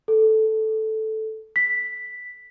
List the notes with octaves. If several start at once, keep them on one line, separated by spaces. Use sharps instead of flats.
A4
B6